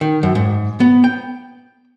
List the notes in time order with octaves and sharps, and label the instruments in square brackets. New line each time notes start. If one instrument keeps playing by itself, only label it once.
[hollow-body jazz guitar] D#3
F#2
G#2
B3
G5